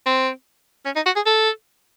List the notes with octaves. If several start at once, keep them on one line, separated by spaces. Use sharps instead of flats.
C4
C#4
D#4
F#4
G#4
A4